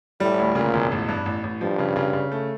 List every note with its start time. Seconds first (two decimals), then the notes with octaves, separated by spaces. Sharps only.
0.20 A2 G3
0.39 D2
0.55 A#2 C#3
0.74 E1
0.91 A1
1.08 G2
1.26 A1
1.43 A1
1.61 G2 F3
1.79 C#3
1.96 C#3
2.13 C#3
2.32 A3